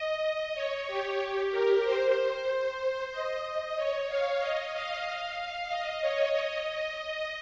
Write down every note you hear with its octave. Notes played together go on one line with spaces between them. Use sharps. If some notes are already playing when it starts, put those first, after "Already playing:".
Already playing: D#5
C#5
G4
A#4
C5
C5
D#5
D#5
C#5
F5
D#5
F5
D#5
C#5
D#5